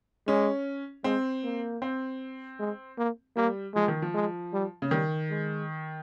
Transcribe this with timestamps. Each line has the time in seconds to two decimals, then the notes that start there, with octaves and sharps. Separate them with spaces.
0.27 G#3 C#4
1.04 G#3 C4
1.44 A#3
1.82 C4
2.60 G#3
2.98 A#3
3.36 G3 A#3
3.75 F3 G#3
3.88 D#3
4.02 F3
4.14 G#3
4.53 G3
4.82 C#3
4.91 D#3 G3
5.30 G#3